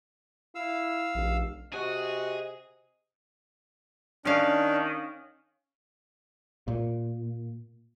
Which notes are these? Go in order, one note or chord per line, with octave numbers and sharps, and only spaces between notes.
E4 F5 E6
F1 A#1
C3 F#4 G#4 D#5
D#3 C#4 D4 F5
A#2